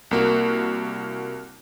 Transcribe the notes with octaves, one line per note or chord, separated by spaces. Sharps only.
C2 A#3 F#4